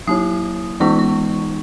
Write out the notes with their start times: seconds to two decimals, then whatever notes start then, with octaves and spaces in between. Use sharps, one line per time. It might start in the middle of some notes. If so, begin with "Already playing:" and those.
0.07 F#3 A#3 E4 D#6
0.80 E3 G#3 B3 D#4 C#6
0.99 C#6